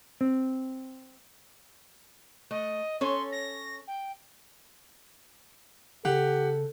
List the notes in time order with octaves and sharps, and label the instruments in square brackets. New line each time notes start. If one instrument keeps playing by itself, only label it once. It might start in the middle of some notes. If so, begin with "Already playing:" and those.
[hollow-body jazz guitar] C4
[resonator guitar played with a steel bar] A3 [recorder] D#5
[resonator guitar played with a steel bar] C#4 A4 C#5 [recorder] C6
[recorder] A#6
G5
[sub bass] C#3 [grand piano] G4 F#5 [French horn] A4